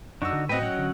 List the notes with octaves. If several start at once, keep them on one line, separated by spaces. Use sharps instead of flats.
F#2 D4 D#4 F#4 C#6 E6
D3
A2 C4 F#4 B4 D#5 G5
F#3 C#4 F#5
D3